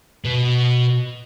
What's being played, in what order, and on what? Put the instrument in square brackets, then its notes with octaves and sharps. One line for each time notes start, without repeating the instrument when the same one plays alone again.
[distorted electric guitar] B2